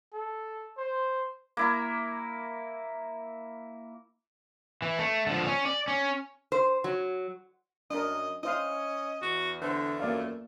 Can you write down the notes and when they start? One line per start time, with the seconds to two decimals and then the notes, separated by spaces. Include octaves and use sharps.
0.13 A4
0.77 C5
1.57 A#3 E4 A#4
4.82 E3
4.99 A3
5.27 D3 F3
5.46 C#4
5.65 D5
5.88 C#4
6.52 C5
6.84 F#3
7.90 F#2 D4 A#4 D#5
8.43 C#4 E4 C5 D#5 F5
9.22 E2 F#4
9.62 D3 A3 B4 C5
10.00 F#2 A#3 D5 F5